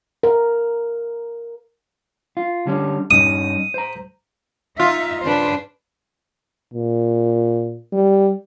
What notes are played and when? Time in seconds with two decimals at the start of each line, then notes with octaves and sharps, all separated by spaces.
0.23 A#4
2.37 F4
2.66 D3 G3 C#4
3.11 G2 C#4 D#4 D#6
3.74 C5 A#5
4.80 D#4 F4 E5
5.23 G2 C#3 D4 B4 C5
6.74 A#2
7.93 G3